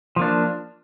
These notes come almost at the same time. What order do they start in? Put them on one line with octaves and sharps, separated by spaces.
F3 A#3 D4